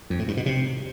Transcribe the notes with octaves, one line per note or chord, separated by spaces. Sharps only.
F2
A2
G2
B2
C3